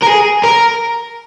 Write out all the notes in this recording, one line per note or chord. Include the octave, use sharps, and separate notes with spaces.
A#4
G#4
A#4